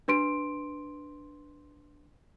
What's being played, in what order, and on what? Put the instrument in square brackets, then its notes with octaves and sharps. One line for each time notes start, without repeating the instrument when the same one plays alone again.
[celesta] D4 B4 C6 D7